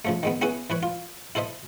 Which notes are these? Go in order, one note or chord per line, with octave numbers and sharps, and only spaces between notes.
C#3 F3 A3
D#3 G#3 B3
B3 C#4 E4 G#4 B4 G#5
E3 B4 C#5
F4
E4 A4 C5 D#5 E5